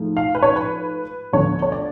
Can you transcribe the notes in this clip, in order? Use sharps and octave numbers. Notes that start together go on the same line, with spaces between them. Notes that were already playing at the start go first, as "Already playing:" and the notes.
Already playing: G#2 F3 A3
F5
B4
C#5
B4
D2 D3 F3 B3 C#5
C#5
D5